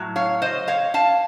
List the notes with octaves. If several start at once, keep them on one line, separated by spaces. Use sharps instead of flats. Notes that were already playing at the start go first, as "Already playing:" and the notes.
Already playing: A2 F#3
C#5 F5
C5 D#5
C#5 F5
F5 A5